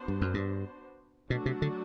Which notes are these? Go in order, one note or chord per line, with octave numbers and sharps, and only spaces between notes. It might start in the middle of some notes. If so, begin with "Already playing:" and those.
Already playing: B3 D4 F#4 C5
G2
F#2
G2
B2 F#3 A3 D4 F#4
C3
D3